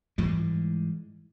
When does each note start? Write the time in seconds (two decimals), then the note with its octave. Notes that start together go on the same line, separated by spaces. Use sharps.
0.18 G#2 E3 G3 G#3